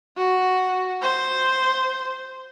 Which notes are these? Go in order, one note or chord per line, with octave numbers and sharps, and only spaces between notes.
F#4
C5